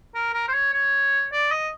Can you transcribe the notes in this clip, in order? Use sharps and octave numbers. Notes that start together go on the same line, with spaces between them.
A#4
A#4
C5
C#5
C#5
D5
D#5